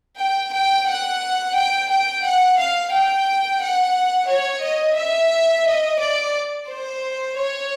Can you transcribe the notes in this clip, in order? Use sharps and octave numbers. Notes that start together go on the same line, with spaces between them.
G5
G5
F#5
G5
G5
F#5
F5
G5
F#5
C#5
D#5
E5
D#5
D5
C5
C#5